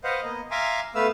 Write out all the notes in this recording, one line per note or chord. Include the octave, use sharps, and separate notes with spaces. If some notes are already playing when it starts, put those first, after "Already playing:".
B4 C5 D#5 F5 F#5
A#3 B3 D#5
E5 F5 G#5 A#5 C6 D6
A3 B3 B4 F5 E6